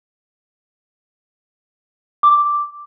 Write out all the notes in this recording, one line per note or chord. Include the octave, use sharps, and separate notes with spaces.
D6